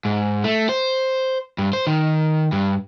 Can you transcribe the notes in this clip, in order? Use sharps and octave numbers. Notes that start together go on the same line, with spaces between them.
G#2
A3
C5
G2
C5
D#3
G2